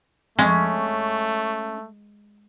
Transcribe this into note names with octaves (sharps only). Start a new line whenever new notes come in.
F2 G#3 A3 C#4